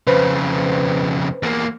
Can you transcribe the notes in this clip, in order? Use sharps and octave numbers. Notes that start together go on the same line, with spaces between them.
F2 C#3 B4 C5
E2 A#3